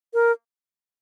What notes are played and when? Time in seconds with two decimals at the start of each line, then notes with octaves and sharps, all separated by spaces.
0.14 A#4